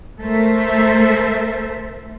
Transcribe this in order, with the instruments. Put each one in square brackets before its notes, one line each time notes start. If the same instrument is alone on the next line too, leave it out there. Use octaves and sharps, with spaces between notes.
[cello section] A3 A4 A#4 C5 E5